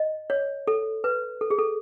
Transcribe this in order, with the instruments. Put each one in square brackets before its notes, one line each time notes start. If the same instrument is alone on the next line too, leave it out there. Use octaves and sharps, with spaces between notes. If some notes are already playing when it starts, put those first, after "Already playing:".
Already playing: [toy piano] D#5
C#5
A4
B4
A4
G#4
A4